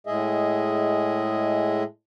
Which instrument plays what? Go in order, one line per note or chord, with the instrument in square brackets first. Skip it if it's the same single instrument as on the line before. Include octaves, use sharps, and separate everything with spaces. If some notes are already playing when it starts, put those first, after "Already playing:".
[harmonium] A2 G#3 G#4 D#5 E5